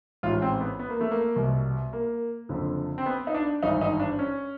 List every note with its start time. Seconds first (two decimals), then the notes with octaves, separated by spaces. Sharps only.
0.23 A1 G#2 E3 F4
0.42 C4
0.61 B3
0.79 B3
0.90 A#3
1.01 A3
1.11 A#3
1.36 C2 B2
1.93 A#3
2.49 F#1 F2 D3
2.98 C4
3.06 B3
3.27 D#4
3.34 D4
3.63 G#1 G2 E3 D#4
3.81 D#4
4.00 D4
4.19 C#4